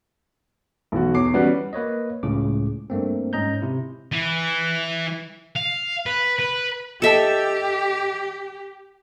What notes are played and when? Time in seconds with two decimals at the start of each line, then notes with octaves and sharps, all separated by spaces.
0.92 B1 E3 F#4
1.14 E2 C#5 D6 C7
1.33 E3 G3 B3 C#4 F#4 B4
1.73 A#3 B4 C#5 D#5
2.23 C#2 A2 C#3 D6
2.90 G2 A3 A#3 C4
3.33 G#2 C#4 D#5 A#5 G6
3.62 C3 E4
4.12 E3
5.56 F5
6.06 B4
6.39 B4
7.02 D#4 G4 A4 D#5 E5 G5 A5